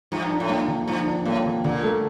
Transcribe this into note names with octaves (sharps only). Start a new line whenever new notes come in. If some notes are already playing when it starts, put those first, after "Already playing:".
G2 F3
D4
A2
G2 A#3
D3
G2 F3
D4
A2 A#3
D3
A#2 D3
A3